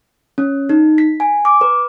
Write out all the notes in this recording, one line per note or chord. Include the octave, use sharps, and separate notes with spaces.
C#4
D#4
B6
G#5
D6
B4